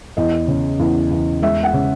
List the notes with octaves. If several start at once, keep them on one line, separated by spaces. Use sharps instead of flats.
E2 D#5
C#3
E2
E2
G#3 E5
F#5
C#3